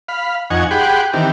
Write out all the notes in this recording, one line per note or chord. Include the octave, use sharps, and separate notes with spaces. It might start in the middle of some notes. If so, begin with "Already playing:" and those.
F5 B5
F2 D#4 F#5 G#5 C#6
G4 G#4 F#5 G5 B5 C6
D#3 E3 C4 G4